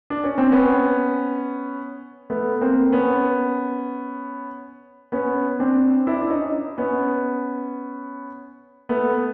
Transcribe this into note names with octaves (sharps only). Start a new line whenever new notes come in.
D4
C#4
C4
B3 C#4
A3 B3
A#3 C4
B3 C#4
B3 C#4
C4 D4
D4 E4
D4
C#4 D#4
B3 C#4
A3 B3